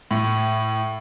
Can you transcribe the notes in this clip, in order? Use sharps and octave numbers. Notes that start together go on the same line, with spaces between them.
A2